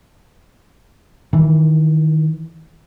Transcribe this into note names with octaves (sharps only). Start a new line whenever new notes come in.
D#3 E3